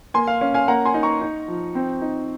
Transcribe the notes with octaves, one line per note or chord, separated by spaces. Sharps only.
A#3 G#5 C6
F5
C#4 F5
F5 G#5
A#3 F#5 A#5
G#5 C6
D#4
A#5 C#6
D#4
F3
C4
D#4